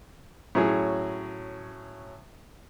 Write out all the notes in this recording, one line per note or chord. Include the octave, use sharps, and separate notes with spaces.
A2 F#3 C#4 G#4